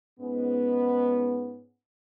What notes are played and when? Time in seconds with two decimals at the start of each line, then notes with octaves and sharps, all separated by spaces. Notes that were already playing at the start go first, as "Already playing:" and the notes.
0.18 G#2 B3 C#4